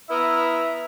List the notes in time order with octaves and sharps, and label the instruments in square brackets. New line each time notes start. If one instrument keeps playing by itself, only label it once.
[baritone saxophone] B3 [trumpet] E4 [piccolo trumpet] E5 [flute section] A#5 D#6 F6